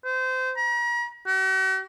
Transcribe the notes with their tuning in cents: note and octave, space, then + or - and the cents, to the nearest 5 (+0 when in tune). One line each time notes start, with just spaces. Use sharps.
C5 -25
A#5 +40
F#4 +45